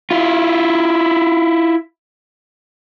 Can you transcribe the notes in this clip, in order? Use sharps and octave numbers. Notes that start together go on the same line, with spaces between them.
E4 F4